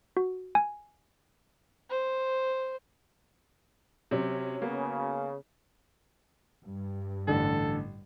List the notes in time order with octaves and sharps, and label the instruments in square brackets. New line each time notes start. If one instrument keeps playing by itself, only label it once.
[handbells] F#4
G#5
[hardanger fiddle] C5
[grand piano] C3 [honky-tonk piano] F#3 C#4
[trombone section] C#3 [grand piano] A#3 B3
[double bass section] G2
[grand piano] A1 D3 [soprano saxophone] A4